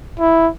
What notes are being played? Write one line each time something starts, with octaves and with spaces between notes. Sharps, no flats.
E4